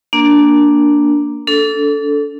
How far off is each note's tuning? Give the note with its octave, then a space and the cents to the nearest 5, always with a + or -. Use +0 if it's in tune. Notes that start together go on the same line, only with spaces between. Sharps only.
A#3 +0 D4 -5 A#4 +0
D4 -35 A4 +0